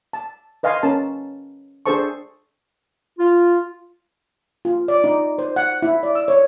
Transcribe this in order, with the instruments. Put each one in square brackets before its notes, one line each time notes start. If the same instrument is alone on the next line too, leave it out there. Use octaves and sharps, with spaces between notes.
[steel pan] A5
B4 D#5 F5 G#5 C6
C#4 A#4 A5
D4 G#4 A4 C5 A5 C#6
[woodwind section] F4
[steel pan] F4
D5
D#4
C5
F#5
E4
D5
E6
C#5